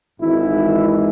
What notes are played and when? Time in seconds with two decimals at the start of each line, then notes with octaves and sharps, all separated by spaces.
0.19 G#1 G#2 E3 G#3 E4